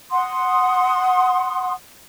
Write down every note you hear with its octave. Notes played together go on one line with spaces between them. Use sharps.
F#5 C6 D#6